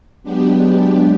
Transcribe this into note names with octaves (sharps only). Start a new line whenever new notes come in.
F#3 G#3 B3 D4 G4